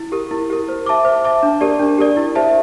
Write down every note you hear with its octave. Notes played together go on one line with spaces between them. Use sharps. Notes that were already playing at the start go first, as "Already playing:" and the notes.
Already playing: E4
G4 A#4
E4
G4 A#4
C5
E5 A5 D6
C5
E5 A5 D6
D4
G4 A#4 D5
D4
G4 A#4 D5
E4
G4 C5 E5 A5